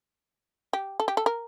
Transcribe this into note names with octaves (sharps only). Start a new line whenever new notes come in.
G4
A4
G4
A4
A#4